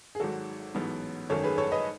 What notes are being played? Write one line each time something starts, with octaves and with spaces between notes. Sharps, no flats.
G#4
G#1 G#2 F#3 F#4 A4
A1 G#2 F#3 B3
G#1 F#2 D#3 A3 A4 C#5
G#4 B4
A4 C#5
B4 D#5